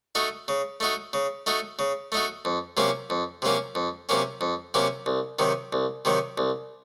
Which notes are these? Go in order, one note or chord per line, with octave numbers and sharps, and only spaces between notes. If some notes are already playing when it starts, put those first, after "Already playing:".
A3 D#4 F#4
C#3
A3 D#4 F#4
C#3
A3 D#4 F#4
C#3
A3 D#4 F#4
F2
C3 F#3 A#3 C#4
F2
C3 F#3 A#3 C#4
F2
C3 F#3 A#3 C#4
F2
C3 F#3 A#3 C#4
C2
C3 D#3 F#3
C2
C3 D#3 F#3
C2